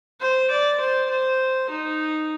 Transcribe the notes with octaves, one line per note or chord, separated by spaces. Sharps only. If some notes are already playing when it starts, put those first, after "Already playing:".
C5
D5
C5
C5
D#4